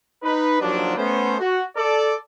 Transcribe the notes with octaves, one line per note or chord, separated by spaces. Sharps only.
D#4 B4
D#2 F3 F#3 D4
A3 B3 C#4 C5
F#4
A4 D5